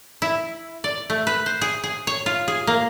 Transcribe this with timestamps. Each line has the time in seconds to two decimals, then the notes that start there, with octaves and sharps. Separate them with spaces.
0.22 E4
0.84 D5
1.10 A3
1.27 B4
1.46 C5
1.61 G#4
1.84 G#4
2.07 C#5
2.26 F4
2.48 G#4
2.67 A#3